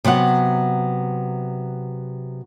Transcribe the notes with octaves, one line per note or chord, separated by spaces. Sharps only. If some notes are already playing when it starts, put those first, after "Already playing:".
C3 F#3 B3 F#5